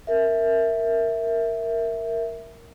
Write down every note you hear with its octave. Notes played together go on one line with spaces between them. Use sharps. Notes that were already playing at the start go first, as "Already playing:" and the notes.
A#4 E5